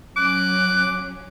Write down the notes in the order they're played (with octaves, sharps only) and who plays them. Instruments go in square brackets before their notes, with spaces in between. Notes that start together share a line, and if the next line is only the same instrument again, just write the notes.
[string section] F#3 C#4 [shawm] D6 [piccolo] F#6